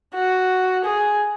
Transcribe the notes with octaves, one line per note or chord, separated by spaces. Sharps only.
F#4
G#4